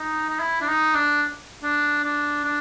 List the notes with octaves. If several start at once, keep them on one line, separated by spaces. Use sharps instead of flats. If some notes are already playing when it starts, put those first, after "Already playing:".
Already playing: D#4
D#4
E4
D4
D#4
D4
D4
D4
D4